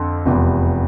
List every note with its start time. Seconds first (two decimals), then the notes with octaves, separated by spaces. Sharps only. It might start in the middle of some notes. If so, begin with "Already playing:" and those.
Already playing: F2 D3
0.26 F1 E2 C3